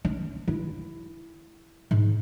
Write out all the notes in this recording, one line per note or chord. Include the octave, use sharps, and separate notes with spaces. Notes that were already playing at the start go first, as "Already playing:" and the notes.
C#4
E4
G#2